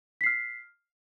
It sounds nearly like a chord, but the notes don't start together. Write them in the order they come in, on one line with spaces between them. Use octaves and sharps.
B6 C7 F6